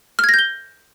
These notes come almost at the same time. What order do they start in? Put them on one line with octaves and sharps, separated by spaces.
F6 G#6 A#6 G6 G7